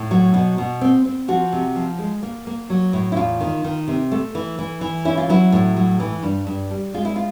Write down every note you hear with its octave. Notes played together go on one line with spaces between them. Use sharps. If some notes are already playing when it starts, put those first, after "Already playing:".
Already playing: A2
F#3
B2
B2
C4
C4
F3 F#4
C3
F3
G#3
A#3
A#3
F#3
A2
E4
E2 F4
D#3
D#3
C3
A3
E3
E3
E3
C#4 E4
F4
F#3 E4
A2
F#3
E3
G2
G2
G3
G#3 F4
E4
F4